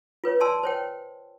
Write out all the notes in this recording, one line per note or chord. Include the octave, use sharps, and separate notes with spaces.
F4 B4 C#5
D5 G#5 A5 C6 E6
C5 C#5 G5